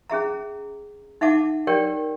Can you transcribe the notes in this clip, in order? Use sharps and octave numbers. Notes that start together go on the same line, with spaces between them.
C#4 G#4 E5 A#5
D#4 E5 F#5 A5 D6
G4 A#4 C#5 D5 G5